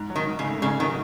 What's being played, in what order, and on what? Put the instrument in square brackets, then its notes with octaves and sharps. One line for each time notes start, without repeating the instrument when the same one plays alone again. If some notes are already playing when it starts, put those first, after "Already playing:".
Already playing: [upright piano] G#2
F#3
[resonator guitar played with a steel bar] D#3
[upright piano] G#2
[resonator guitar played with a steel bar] C#3
[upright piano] A3
[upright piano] G#2 [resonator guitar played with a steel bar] C#3
[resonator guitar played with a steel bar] D#3 [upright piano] F#3